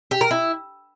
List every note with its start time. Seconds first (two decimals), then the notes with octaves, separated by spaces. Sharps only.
0.11 G4
0.21 A#4
0.31 E4